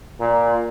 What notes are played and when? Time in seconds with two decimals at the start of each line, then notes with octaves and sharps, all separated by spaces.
0.20 A#2